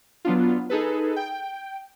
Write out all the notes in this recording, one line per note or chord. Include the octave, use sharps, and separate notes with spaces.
F#3 B3 D4 F4
D#4 G#4 A4 B4
G5